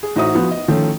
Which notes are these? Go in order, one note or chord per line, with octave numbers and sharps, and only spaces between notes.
G#4
A1 D#4 F#4 C5 E5 D#6
F3 B3 F#4
D#5
D#3 F3 A3 C#4